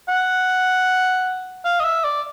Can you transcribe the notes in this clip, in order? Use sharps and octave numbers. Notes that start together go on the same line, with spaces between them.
F#5
F5
D#5
E5
D5